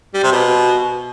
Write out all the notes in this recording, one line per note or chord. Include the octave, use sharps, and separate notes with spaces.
G3
C3
B2